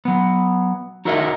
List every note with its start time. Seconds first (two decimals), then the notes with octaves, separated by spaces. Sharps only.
0.05 F#3 B3
1.05 D#4 F#4 A4 A#4 D#5 E5